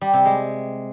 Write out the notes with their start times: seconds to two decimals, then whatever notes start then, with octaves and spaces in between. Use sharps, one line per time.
0.01 G3
0.13 C3
0.25 G#3